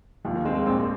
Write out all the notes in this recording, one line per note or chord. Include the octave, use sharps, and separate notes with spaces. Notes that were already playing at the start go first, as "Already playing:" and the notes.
D#2 F3
D#3
G#3 C4
C4
A#3
A#1 C4